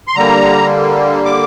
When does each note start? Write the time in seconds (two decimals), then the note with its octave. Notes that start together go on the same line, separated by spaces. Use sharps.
0.08 C6
0.15 D3 G3 A#3 A#5
1.25 D6